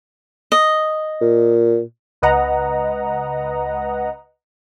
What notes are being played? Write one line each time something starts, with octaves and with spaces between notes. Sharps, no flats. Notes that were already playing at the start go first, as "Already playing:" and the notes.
D#5
A#2
C#2 B4 D#5 F#5 A#5